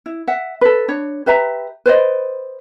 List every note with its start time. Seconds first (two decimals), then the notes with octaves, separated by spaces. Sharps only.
0.06 E4
0.27 E5 F#5
0.61 A4 B4
0.88 D4 C#5
1.26 G4 B4 E5 A#5
1.86 B4 C5 D5 D#5